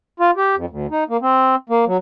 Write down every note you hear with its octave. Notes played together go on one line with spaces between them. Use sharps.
F4
G4
F2
D2
D#4
A#3
C4
A#3
F#3